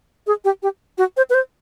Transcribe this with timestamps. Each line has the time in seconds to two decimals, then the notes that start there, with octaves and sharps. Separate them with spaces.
0.27 G#4
0.44 G4
0.63 G4
0.98 F#4
1.17 C5
1.30 B4
1.34 C5